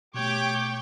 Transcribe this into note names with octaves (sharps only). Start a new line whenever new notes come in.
B2 A3 G4 C#5 G5 D6